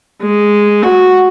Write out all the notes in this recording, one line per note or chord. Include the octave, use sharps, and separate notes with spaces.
G#3
F#4